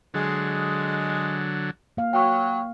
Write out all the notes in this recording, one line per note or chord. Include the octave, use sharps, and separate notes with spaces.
D3 F#3 G#3
A#3 F5
F#3 G5 C#6